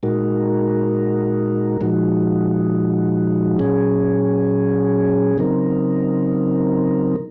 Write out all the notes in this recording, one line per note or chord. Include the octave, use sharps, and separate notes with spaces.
A#2 G#3 D#4 F#4 A#4
A#2 F3 G#3 D#4 F#4
A#2 F#3 C#4 G#4
C#3 F#3 C4 D#4 A#4